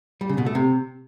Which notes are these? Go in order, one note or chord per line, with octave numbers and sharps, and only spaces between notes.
G3
C#3
B2
A3
C3